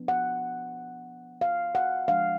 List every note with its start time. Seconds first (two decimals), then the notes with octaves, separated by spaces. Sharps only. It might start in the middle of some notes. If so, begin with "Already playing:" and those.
Already playing: F3 B3 D4
0.08 F#5
1.41 F5
1.75 F#5
2.08 F3 G#3 D4 F5